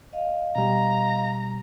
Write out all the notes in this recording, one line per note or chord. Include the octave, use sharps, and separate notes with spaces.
D#5 F5
B2 G3 A#5